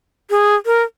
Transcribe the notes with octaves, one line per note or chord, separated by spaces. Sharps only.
G#4
A#4